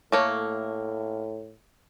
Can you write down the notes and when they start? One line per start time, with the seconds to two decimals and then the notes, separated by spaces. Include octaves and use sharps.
0.12 A2 A3 A#3 C#5